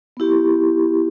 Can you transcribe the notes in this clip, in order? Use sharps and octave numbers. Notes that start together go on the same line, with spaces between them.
B3 E4 G4